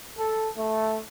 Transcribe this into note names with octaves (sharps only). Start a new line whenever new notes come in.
A4
A3